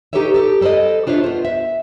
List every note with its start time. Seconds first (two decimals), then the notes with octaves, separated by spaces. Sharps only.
0.13 D#4 G4 A4 B4 C#5 E5
0.34 G4 A4
0.61 G3 A4 C5 D5 D#5
1.07 D4 F4 C5 C#5 E5
1.24 B3 C5
1.45 E5